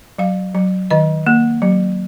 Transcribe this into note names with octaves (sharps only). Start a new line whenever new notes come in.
F#3 F5
F#3
D#3 D#5
A#3
F#3